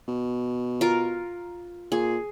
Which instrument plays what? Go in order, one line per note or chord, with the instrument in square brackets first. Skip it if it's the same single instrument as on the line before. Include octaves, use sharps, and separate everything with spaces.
[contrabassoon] B2
[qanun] F4 A#4
[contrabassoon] A#2 [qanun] G#4